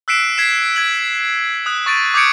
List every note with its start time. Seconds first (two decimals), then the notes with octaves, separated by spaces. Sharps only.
0.08 E6 F#6 B6 C7 D7 E7
0.38 G#6 B6 C7 E7
0.76 G#6 F#7
1.66 D#6 F#6
1.86 C#6 A6 D7 D#7
2.14 D6 D#6 G6 G#6 C#7 D7